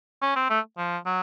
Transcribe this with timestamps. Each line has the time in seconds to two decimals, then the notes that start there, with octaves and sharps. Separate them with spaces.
0.22 C#4
0.36 C4
0.50 A3
0.78 F3
1.06 F#3